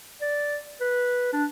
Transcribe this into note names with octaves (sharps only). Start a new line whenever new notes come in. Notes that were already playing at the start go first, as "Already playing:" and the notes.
D5
B4
D4